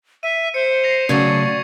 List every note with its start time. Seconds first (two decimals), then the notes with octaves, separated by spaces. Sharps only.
0.23 E5 D#7
0.54 C5 C#7
0.84 A#6 C7 F7
1.09 C#3 F#3 A3 D5 C#6 G#6 C#7